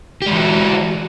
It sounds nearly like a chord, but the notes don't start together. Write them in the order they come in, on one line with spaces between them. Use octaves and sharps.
G4 G#3 E3 F#4